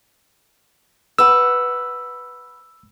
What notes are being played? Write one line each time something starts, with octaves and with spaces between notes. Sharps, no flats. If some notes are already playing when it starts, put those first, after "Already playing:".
B4 F#5 E6